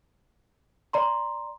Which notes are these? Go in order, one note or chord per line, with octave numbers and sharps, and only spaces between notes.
D5 A#5 C6